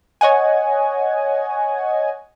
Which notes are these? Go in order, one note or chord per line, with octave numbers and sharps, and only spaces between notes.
C#5 D#5 F#5 G#5